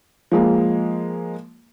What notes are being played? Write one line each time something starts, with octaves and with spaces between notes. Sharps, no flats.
F3 G#3 A#3